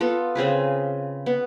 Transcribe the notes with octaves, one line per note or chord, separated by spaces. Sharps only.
B3 F4 A4
C#3 C4 G#4 B4
B3